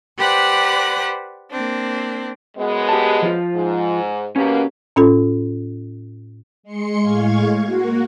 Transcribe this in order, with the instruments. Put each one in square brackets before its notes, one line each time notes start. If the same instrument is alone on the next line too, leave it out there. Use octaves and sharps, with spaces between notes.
[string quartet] G4 B4 C5 D5 F#5 F#6
A#3 C4 D4
[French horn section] F#2 G#3 B3
[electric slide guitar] G4 A5
F3 F4
[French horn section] G#2
[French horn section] B2 A#3 [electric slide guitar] C#4 G4
[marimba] A2 C#4 F4 A4
[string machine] G#3 C6 C#7
A2 G#3 F5 C#6 G#6
A#3 F#4